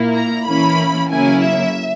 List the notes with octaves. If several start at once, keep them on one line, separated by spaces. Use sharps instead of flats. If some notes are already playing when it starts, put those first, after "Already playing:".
Already playing: A#2 A#3 E4
A#5
E3 A#3 C#4 E4 B5
C#3 F#3 A#3 C#4 E4 G#5
E5